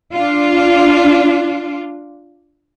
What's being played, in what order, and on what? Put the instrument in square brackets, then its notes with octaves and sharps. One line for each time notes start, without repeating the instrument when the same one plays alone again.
[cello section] D4 F4